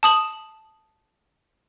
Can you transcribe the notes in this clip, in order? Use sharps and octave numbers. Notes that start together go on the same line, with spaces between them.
A5 D#6 F#7